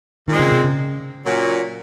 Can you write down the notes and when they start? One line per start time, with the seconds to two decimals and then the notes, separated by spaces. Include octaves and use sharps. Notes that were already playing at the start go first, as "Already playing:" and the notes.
0.28 A#2 D#3 G#3 C4
0.39 C#3
0.52 C3
0.64 C#3
1.26 A#2 F#3 C#4